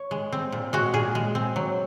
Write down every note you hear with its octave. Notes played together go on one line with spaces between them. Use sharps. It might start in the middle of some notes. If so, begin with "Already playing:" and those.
Already playing: C#5
G#3
C4
A#2
G#3 F#4
A#2 G#4
G#3
C4
F#3